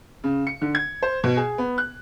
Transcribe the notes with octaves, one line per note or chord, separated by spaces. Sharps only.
C#3
C#7
D3
G#6
C5
B2
G#4
B3
F#6